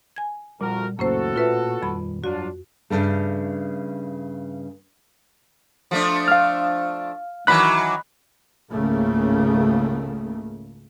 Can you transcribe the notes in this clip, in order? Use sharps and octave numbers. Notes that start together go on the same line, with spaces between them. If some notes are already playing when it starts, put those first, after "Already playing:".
G#5 G#6
F2 A#2 G3 F#4 A#4
C#2 F#2 A2 A#3 C#4 F#4 A4 C5
A#2 F4 B4 E5
D#1 F2 G3 B5
G2 F#3 D4 F4 F#4
G2 C#3 A3
F3 A3 D4
F5 F6
D#3 E3 F#3 B5 F#6
G#1 C#2 C#3 A3 A#3